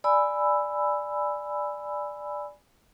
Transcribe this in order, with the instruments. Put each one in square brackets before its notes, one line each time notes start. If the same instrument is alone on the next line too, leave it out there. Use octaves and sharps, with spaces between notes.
[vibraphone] D5 G#5 B5 E6